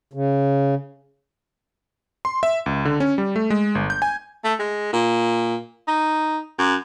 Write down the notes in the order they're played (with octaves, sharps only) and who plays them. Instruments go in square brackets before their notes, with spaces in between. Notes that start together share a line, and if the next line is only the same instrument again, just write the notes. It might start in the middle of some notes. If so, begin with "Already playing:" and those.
[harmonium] C#3
[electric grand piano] C6
E5
C#2
D3
C#4
G3
A3
G#3
G1
G6
G#5
[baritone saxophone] A3
G#3
A#2
D#4
F#2